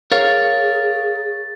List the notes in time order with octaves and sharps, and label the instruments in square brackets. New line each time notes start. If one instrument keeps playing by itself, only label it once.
[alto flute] G#4 [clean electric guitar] A#4 C#5 F5 [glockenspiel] A6